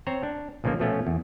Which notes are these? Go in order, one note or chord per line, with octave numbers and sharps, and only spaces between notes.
C4 C5 C#5 A#5
D4
B1 A#2 C#3 F3 A#3
B2 F3 A3 B3 C#4
E2